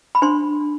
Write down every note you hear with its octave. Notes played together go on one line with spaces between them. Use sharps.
B5
D4 C5 C6